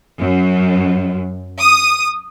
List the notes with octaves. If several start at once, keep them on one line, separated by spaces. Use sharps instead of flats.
F#2
D#6